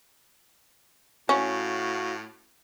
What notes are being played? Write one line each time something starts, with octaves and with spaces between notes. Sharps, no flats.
A2 C#4 F#4 F5